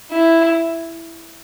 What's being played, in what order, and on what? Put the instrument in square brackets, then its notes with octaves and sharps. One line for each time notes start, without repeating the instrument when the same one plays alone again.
[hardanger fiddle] E4